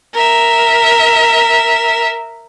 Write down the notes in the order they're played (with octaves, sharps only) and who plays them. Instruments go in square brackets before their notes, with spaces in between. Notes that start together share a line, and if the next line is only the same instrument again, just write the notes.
[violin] A#4 E5